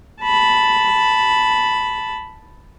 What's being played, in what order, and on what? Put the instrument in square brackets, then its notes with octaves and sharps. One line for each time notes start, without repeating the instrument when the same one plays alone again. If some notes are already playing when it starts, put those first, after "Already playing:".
[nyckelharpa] A5 B5